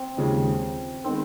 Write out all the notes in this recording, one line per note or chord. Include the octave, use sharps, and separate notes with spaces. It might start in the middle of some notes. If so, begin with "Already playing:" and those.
Already playing: C4
D#2 C#3 F3 G#3 C#4
D#3 G#3 B3 C4